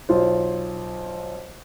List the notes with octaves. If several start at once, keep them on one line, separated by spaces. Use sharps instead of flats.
B1 F4 C5